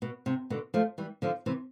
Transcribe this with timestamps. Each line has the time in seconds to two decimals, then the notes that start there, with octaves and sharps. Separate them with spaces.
0.02 B2
0.26 C3
0.50 B2 D3
0.74 F3 A3
0.98 E3 G3
1.22 D3 F3
1.46 C3 E3